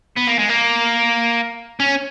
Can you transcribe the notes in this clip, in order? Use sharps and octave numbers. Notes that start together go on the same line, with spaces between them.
B3
A#3
G#3
A#3
C#4